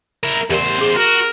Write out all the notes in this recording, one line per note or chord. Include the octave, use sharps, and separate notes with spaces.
E4 A#4
E2 G4 A#4 C5 D5
C#4 G#4
F#4 A#4 F#5